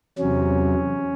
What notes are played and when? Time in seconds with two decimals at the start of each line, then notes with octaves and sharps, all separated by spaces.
0.18 E2 C3 F#3 C#4